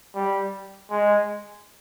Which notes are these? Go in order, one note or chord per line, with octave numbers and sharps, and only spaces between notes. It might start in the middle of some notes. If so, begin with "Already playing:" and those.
G3
G#3